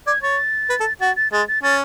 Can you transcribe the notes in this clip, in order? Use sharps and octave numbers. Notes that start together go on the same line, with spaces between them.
D5 G#6
C#5 A6
B4
A4
F#4 A6
A6
G#3 A6
A6
C#4 A6